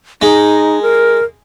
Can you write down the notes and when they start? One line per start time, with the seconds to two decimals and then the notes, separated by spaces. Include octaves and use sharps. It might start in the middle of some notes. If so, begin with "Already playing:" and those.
0.22 G#3 D#4
0.82 A#4